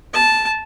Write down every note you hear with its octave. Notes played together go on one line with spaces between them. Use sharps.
A5